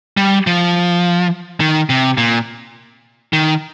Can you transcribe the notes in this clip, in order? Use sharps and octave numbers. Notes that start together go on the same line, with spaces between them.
G3
F3
D#3
C3
A#2
D#3